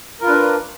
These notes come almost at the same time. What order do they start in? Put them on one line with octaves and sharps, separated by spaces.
A#4 F4 B4 D4